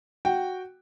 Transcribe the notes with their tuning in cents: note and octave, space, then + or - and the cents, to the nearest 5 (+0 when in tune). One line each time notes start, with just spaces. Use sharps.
F#4 +0 G5 +0